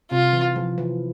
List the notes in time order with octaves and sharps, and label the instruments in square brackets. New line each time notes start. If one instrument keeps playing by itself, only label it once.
[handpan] C3 [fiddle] F4
[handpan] E3
F3
E3